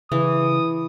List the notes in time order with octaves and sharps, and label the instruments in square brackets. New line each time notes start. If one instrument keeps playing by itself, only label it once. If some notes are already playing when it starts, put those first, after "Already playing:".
[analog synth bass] C#3 [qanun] E3 [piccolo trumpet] D#6